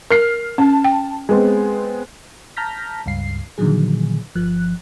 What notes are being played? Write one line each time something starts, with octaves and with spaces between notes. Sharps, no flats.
A#4 F6 C7
C#4 A5
G5
G#3 B3 C4
A5 A#5 F6 G6 A#6 B6
C#2 G2 F5 C7
A#2 D3 D#3 F3 F#3 G#4
G1 F3 F#6